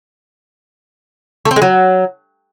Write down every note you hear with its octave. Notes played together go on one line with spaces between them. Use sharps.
A3
C4
G#3
F#3